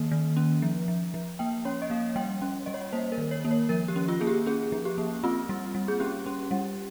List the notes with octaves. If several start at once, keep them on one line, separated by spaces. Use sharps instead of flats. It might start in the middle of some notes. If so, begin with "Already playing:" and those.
Already playing: D#3 A#3
D#3
C#4
F3
F3
F3
A#3 G5
C#4 C#5
D#5
A#3 F5
G3 G5
C#4
G3 D#5
C#5
A#3 C5
A#4
D#3
C#5
A#3
C#5
F3 A#4
G4
C#4
F4
A#3 G#4
G4
C#4 G#4
F3
G4
A#3
C4 F4
G3
G3
G#4
C#4 G4
C#4
G3